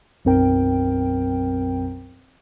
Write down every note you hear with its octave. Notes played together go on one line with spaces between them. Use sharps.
B1 F#2 C4 A#4 G5